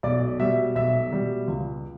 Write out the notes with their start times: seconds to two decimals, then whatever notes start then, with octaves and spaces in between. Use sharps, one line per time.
0.03 B1 D5
0.39 B2 G3 E5
0.76 B1 E5
1.12 B2 G3
1.48 C#2